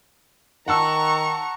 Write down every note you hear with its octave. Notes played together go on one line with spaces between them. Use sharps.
D#3 F#5 A5 A#5 C#6 E6